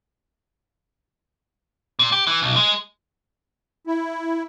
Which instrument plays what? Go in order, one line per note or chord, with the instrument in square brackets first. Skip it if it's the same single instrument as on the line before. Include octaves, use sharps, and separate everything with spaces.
[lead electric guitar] A#2
G4
E3
B1
G#3
[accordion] E4